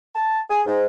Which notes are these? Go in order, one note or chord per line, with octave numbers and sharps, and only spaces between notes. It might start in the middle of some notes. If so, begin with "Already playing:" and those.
A5
G#4
G#2